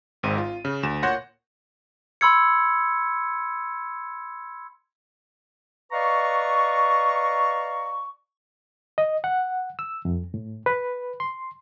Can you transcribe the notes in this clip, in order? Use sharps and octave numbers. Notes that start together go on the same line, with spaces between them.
G#1 G#2 C4 D#7
F4
C#3
D2 E7
A#2 C#5 F#5 C6 G6 A#6
B5 C6 E6 G#6 C#7
B4 D5 D#5 F5 A#5 C#6
D#5
F#5
E6
F2
A2
B4
C6